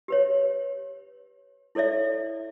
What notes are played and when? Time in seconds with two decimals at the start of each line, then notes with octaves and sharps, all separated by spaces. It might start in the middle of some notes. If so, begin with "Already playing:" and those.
0.08 G4 B4 C#5
1.75 E4 A4 C#5 D5 E5